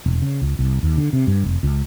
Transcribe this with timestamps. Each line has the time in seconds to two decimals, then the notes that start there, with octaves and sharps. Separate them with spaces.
0.06 E1
0.22 C#3
0.42 C#2
0.59 C2
0.83 D#2
0.98 D3
1.13 C3
1.27 G2
1.44 F1
1.63 C#2